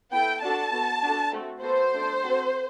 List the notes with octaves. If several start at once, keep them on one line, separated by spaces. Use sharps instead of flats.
B3 E4 A4 G5
D4 F#4 A4 A5
B3 F#4 A4
D4 F#4 A4
A3 C4 F#4 A4
B3 F#4 A4 C5
A3 D4 A4
C4 F#4 A4